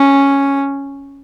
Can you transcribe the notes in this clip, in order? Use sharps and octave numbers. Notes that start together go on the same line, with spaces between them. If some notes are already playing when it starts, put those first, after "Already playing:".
Already playing: C#4